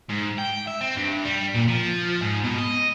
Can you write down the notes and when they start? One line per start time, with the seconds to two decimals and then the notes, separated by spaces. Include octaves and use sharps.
0.09 G#2
0.39 G5
0.68 E5
0.81 C4
0.97 G2
1.25 G3
1.55 A#2
1.68 F3
2.21 G#2
2.43 B2
2.58 D#5